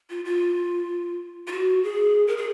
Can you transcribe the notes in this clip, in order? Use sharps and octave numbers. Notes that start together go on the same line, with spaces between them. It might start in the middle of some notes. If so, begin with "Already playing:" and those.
F4
F4
F4
F#4
G#4
A#4
G#4